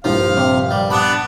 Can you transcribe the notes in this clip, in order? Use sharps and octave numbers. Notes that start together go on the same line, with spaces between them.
A#1 G2 F3 F5
C3
G3
B3 D4 B5